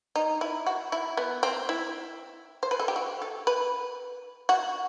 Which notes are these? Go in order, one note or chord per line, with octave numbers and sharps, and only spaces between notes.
D#4
E4
F#4
E4
B3
C4
E4
C5
B4
A4
G4
F#4
A4
B4
F#4